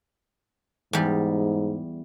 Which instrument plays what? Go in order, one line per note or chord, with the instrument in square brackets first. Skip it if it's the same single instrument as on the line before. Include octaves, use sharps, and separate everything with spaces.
[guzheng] E2 G3 [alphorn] G#2